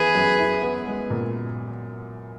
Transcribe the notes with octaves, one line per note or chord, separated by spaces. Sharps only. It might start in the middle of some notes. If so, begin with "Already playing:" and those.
Already playing: E3 B3 G#4 B4
F#2
E4
B3
G#3
A#2